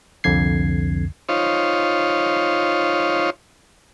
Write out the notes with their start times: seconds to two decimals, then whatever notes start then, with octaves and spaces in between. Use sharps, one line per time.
0.24 C2 F2 D3 G#6 C7
1.29 D#4 F4 C5 C#5